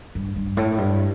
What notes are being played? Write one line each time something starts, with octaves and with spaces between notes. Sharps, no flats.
G2
G2
A2
G2